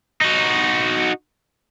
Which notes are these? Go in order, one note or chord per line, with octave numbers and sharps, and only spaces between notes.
D#4 F#4